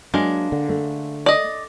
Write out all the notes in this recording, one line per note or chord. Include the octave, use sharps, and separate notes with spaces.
F#3 G#3 A#3 D4
D3
A3
D5 D#5